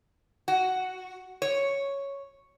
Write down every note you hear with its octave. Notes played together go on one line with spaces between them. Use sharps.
F#4
C#5